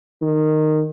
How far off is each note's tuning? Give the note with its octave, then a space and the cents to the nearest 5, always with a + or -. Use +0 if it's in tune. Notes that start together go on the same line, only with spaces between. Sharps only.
D#3 -15